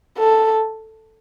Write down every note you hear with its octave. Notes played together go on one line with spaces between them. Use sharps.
A4